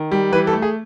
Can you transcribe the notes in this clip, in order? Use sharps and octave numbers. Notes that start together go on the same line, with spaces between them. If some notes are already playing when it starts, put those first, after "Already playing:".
Already playing: D#3
G3
E3 B4
A4
A3
G#4